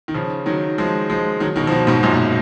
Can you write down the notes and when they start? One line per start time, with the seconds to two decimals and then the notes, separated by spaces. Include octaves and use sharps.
0.08 D#3
0.15 C#3 F3
0.46 D#3 F#3
0.78 F3 G#3
1.10 F3 G#3
1.40 D#3 F#3
1.56 B2 D#3
1.67 F3
1.71 B2 D#3
1.87 G#2 B2
2.03 F#2 A#2